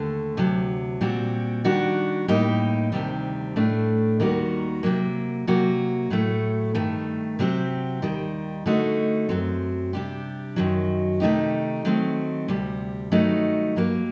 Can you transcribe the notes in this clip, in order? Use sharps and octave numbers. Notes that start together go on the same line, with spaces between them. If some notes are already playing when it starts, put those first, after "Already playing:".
Already playing: D#2 D3 A3
D2 C3 F#3
A#2 G3 C4 F#4
D#3 G3 D4 F#4
A2 G3 A#3 D#4 G4
D2 C3 D#3 G3 C4
A2 A3 D4
D#2 D#3 G3 A#3 F#4
C3 F#3 A#3
C3 F#3 A#3 F#4
A2 F#3 A3
G2 D#3 A3
C3 F#3 C4 G4
D#2 D#3 G3
D3 A3 D#4 F#4
F#2 F#3 C4
C3 G3 D4 G4
F#2 D#3 F#3
C3 D#3 A3 D#4 G4
D#3 F#3 A3 C4
D2 C3 G3
G2 D#3 F#3 A3 D#4
G2 F#3 A#3